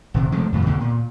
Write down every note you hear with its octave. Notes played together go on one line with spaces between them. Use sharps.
D#1 C3
C3 F3 G#3 A3
F2 A2 D3 D#3
C#2 B2 D3
A#2